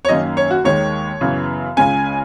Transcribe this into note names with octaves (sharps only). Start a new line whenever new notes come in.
C#5
F#2 D#3 A#3 C#4 D#5
C#5
F#4
D#2 D#3 G#3 C#5
F#2 C#3 E3 B3
C#2 C#3 G#3 C#4 G#5